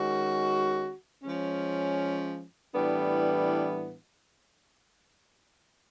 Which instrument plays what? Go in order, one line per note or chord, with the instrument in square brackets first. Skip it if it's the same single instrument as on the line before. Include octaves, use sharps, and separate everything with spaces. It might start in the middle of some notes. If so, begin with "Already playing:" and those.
Already playing: [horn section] D#3 G#3 C#4 F#4
F3 G#3 C#4
A2 E3 G3 B3 D4